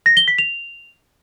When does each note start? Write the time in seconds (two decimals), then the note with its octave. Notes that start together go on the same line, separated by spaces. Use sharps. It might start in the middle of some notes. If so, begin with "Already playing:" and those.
0.06 A#6
0.17 G7
0.28 B6
0.38 F7